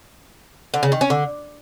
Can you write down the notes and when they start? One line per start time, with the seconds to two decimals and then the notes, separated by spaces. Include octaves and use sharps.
0.74 D3
0.83 C#3
0.92 D#3
1.01 C#4
1.10 D3